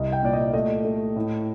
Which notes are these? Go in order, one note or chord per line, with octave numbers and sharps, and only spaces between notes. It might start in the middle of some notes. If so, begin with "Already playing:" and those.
Already playing: C2 D#5
G5
A#2 D5
D#5
A3 D#5
A3
A2